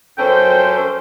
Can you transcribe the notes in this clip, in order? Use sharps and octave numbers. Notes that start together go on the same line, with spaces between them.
F#2 C#4 A4 C5 G5